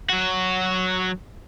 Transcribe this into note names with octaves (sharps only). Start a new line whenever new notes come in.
F#3 F#4